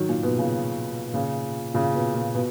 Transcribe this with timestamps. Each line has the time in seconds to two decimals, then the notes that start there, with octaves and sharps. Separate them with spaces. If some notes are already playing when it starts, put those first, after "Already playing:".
Already playing: D#3 F#3
0.09 A#2
0.23 B2
0.38 A#2 C#3
1.14 A#2 C#3
1.74 A#2 C#3
1.94 B2
2.14 A#2
2.35 B2